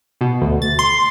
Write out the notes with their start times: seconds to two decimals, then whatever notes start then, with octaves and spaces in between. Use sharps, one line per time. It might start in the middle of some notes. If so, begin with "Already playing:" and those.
0.21 B2
0.42 D2
0.62 A6
0.79 C6